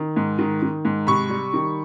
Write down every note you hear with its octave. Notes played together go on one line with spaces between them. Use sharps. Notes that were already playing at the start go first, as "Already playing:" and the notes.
Already playing: D#3
G#2
D#3
D#3
G#2
C3 B5 C#6
G3
D#3